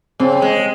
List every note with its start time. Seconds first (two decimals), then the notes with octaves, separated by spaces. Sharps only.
0.20 C#3 C4
0.42 G#3